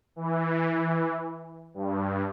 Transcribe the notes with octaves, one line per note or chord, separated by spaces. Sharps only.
E3
G2